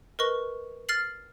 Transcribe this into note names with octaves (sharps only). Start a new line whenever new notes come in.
A#4 B4 D#5 C#6 G7
F6 A6 C7 F#7